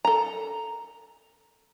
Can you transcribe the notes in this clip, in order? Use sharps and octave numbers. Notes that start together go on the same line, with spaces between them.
A4 A#5